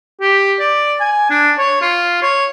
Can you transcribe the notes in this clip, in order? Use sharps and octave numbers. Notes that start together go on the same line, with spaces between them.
G4
D5
G#5
D4
C#5
F4
C#5